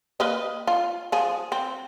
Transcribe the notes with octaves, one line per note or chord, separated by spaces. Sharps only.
A#3 B4 D#5
F4
F3 G#4
C4